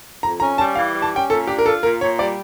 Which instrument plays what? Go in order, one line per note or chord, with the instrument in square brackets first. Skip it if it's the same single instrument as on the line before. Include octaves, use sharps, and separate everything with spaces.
[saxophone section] F2 [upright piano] A#5
[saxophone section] C#4 [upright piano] A#5
[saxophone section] G3 [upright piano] A5
[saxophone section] E3 [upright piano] F5
[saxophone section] G3
[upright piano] A5
[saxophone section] C#4 [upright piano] G5
[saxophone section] A#2 [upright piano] A4
[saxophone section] D4 [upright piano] G4
[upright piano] A#4
[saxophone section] F4 [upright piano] A4
[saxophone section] A#2 [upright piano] A#4
[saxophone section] A#2 [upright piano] C#5
[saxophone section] G3 [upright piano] D5